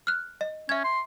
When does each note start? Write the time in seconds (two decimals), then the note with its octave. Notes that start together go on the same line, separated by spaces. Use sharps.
0.07 F6 F#6
0.41 D#5
0.69 C#4 E5 G#6
0.84 C6